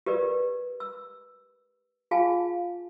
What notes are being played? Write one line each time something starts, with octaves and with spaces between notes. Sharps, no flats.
G4 A#4 B4 D5
E6
F4 G#4 F5 G#5 A5